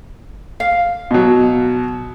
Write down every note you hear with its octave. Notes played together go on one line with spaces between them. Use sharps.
F5
B2 F#3